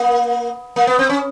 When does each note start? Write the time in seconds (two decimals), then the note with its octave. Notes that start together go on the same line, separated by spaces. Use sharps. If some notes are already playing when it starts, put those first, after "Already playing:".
Already playing: A#3
0.76 A#3
0.87 B3
0.99 C4
1.10 C#4